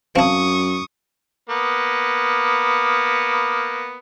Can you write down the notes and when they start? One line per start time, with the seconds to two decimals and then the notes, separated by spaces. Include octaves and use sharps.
0.16 F#2 C4 E4 F5 A5 C#6 D#6
1.49 A#3 B3